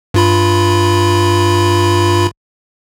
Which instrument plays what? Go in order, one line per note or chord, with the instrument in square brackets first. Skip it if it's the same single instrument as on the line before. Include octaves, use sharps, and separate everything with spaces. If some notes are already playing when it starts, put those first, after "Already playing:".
[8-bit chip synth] G2 F4 B5